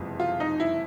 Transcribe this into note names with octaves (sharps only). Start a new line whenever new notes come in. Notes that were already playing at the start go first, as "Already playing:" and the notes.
Already playing: F#1 F2 C3 E3 G#3
F4
D#4
E4